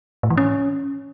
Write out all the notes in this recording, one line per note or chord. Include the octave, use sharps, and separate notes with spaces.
A2
E3
C#4